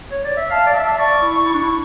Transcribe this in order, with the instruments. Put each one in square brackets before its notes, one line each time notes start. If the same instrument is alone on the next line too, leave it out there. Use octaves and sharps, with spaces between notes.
[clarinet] C#5
D5
E5
[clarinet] F5 [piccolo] A5
[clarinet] D5
[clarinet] E5 [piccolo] A5
[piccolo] A5
[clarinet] D5 [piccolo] C#6
[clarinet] E4
E4
D4
E4